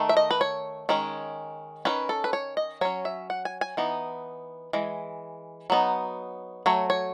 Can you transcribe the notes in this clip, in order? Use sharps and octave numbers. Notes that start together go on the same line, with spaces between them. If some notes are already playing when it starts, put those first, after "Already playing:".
Already playing: D#3 A3
E5
D#5
B4
C#5
D#3 G#3 C#4
D#3 F#3 C#4 B4
A4
B4
C#5
D#5
F#3 C#4 C#5
E5
F#5
G#5
G#5
E3 B3 D#4
E3 G#3
F#3 B3 D#4
F#3 A3 C#5
C#5